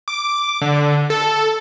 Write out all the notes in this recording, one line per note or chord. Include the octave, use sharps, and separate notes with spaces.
D6
D3
A4